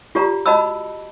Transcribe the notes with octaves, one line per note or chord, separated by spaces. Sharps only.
F4 G4 D5 A#5
F#4 D#5 A5 B5 E6